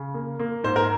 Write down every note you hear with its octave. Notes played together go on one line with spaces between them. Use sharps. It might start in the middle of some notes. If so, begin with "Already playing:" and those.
Already playing: C#3
A#3
A#3
G#2 C5
A#4